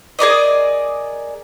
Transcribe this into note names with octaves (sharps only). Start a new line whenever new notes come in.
G#4 A#4 D5 D#5